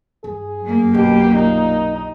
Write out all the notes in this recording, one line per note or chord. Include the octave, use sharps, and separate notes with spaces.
G2 G#4
F#2 A#3
B1 B2 G4
A#2 D#4